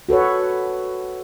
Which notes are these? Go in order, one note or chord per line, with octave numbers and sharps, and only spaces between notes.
F#4 A4 B4 C#5